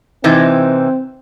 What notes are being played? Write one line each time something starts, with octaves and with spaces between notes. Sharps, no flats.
C3 E3 C4 D#4